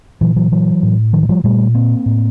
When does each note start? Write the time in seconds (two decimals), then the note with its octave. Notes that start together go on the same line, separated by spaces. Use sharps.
0.21 A#2 E3 F#3
0.36 E3 F#3
0.52 E3 F#3
0.83 A2
1.13 D#3 F3
1.23 F#3
1.29 F3 G3
1.44 A#2 G3 A3
1.75 A#3 C4
2.06 A2